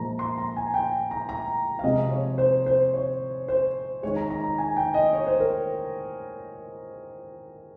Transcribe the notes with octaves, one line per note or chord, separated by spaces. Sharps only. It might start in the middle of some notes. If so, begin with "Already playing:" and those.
Already playing: A#2 F3 G#3 A#5
C6
A#5
G#5
G5
A#5
A#5
F5
C3 F3 G#3 D#5
C#5
C5
C5
C#5
C5
D#3 G#3 C#5
A#5
A#5
A#5
G#5
G5
D#5
C#5
C5
A#4